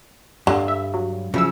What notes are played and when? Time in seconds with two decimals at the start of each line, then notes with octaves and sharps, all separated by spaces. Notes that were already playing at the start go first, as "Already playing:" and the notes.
0.47 G2 D3
0.68 E5
0.94 F#3
1.34 C#3 F3 F#3 E4 E6